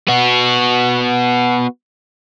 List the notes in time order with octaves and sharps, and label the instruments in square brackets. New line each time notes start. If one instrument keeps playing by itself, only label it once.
[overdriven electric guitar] B3 F#4